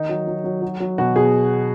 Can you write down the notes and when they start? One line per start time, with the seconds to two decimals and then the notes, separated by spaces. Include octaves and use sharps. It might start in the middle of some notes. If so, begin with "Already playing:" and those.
Already playing: D#3 D#4
0.09 F#3
0.27 F#3
0.44 F#3
0.62 F#3
0.80 F#3
0.98 B2 F#4
1.16 B2 G#4